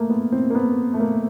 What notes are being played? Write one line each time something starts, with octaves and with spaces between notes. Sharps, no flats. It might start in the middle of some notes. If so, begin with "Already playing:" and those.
Already playing: A3 A#3
B3
C4
A#3
B3
A3
A#3